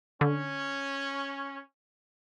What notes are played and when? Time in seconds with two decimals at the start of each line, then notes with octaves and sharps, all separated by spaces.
0.21 D3 C#4